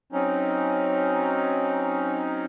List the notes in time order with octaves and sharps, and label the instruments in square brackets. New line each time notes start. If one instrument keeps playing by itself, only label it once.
[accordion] F#3 C4 C#4 D#4